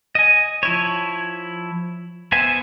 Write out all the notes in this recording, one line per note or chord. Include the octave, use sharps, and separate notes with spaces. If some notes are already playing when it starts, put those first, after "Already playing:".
D#5 G#5
F3 E4 C#5
B3 C5 E5 G#5